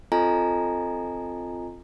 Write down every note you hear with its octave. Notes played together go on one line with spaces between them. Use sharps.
C4 F4 A4 D#5 G#5 A#5